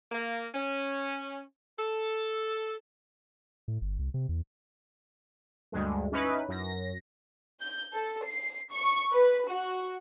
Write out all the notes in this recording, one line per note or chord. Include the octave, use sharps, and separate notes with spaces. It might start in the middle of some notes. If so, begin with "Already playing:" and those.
A#3
C#4
A4
A2
G1
C2
C3
E2
D2 G2 G#3
C#4 D#4 E4 B4
F#2 A#6
G6
A4
C7
C#6
B4
F#4